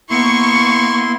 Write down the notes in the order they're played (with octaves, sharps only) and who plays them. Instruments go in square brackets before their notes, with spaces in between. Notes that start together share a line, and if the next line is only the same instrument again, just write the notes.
[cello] A#3 B3 [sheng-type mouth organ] E4 C6 [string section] C#6